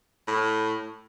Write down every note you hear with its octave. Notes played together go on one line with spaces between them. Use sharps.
A2